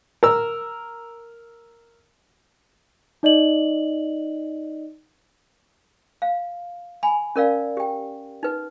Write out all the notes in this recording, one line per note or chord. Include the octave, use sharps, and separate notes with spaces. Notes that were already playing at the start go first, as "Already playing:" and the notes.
A#4 E6
D#4 D5 D#5 F#7
F5
G#5 B5
C#4 A#4 D5 F5
G4 G5
D#4 B4